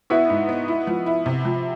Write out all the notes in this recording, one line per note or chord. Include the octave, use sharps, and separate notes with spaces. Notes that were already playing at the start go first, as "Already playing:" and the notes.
B3 E4 F#4
G#2
B3
E4
F3
E4
C3
F3